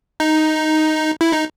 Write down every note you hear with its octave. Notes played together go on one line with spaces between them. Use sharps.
D#4
E4
D#4